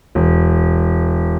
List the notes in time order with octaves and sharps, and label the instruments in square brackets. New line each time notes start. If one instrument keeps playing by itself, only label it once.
[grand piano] E1